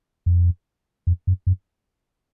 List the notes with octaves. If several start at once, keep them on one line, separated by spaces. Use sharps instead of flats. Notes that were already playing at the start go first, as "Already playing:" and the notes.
F2
F2
F#2
F#2